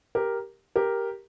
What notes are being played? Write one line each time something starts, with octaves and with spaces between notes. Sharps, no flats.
G4 A#4
G4 A#4